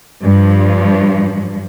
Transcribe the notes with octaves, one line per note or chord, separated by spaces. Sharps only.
G2 F3